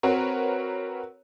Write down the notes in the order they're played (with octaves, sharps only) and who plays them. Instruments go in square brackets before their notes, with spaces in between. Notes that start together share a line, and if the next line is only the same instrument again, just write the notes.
[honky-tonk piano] C4 F#4 A#4 B4 C#5